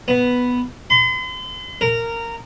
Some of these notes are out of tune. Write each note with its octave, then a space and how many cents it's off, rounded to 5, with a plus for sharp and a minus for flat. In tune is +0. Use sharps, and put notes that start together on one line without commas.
B3 +0
C6 -45
A#4 -15